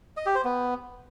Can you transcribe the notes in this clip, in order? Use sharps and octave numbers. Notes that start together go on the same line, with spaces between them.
D#5
G4
C5
B3